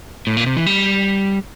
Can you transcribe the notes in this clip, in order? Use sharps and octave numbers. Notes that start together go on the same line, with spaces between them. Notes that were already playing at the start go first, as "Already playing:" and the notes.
A2
A#2
C3
E3
G3